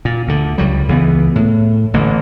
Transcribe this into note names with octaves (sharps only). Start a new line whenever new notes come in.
A#2
D2 D3
C#2 F#3 G3
C#2 E3 B3
A2
A1 D3 A#3